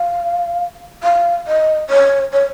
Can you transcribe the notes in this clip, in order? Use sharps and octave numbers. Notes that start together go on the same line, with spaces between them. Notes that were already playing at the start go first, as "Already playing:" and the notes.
Already playing: F5
F5
D#5
C#5
C#5